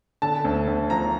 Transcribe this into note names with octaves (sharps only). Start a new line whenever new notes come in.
D3 A5
D2
D2
F3 A#5